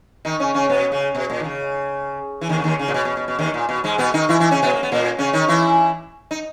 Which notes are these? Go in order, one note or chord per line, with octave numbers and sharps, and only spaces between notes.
D#3 D#4
C#3 C#4
C#3 C#4
B2 B3
C#3
B2
A#2
D#3
C#3
E3
D#2 D#3
C#3
D#2 D#3
C#3
A#2
B2
B2
B2
B2
D#2 D#3
A#2
B2
G#2 G#3
B2 B3
D#3 D#4
E3 E4
E3 E4
C#3 C#4
B2 B3
A#3
B3
A#2 A#3
C#3 C#4
D#3 D#4
E3 E4
D#4